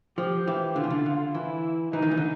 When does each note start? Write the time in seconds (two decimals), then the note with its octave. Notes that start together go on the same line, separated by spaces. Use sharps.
0.18 F3 G4
0.47 E3
0.76 D3 F4
0.83 C#3
0.90 D3
1.06 D3
1.34 E3 E4
1.93 E3 D#4
2.02 D#3
2.11 E3
2.17 D3